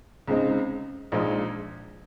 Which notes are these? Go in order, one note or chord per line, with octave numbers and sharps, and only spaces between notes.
C#2 C#3 G#3 C4 D#4
A#1 A#2 F3 G#3 D#4